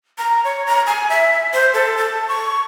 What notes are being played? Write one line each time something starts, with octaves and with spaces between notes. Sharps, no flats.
A#5
C#5
A#5
G#5
E5
C5
A4
A5
C#6